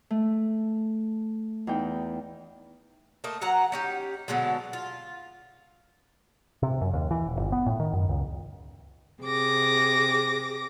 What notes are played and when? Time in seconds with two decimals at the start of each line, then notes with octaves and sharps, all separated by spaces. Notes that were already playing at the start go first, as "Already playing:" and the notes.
0.11 A3
1.67 E2 D#4 G5
3.24 A3 A#3 D#5
3.42 F#3 F#5 A#5
3.72 C#4 D#4 G4
4.28 B2 D3 F#3 G#3
4.73 F4
6.63 C3
6.81 F#2
6.93 D#2
7.11 E3
7.26 D#1
7.39 G1
7.52 B3
7.66 A2
7.80 D#3
7.93 F#2
8.09 C#2
9.22 C3 G#4 D6 A#6